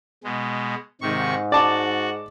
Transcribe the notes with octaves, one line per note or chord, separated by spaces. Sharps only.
B2 G#3
G#2 C3 D#3 C#6
F#4 D5 A5